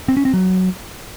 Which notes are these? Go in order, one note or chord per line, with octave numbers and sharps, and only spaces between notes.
C4
C#4
C4
F#3